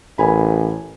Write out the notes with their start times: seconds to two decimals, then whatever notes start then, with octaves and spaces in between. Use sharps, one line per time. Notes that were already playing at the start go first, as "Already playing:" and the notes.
0.18 A1 A#4 G#5 B5